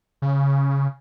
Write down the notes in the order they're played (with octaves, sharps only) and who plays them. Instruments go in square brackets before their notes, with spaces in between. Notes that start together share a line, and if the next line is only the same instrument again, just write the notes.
[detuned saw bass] C#3